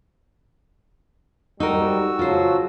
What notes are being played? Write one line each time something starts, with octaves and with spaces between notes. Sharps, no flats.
G#2 G3 D#4 F#4 A#4 E6
C#3 F3 F#3 F4 C5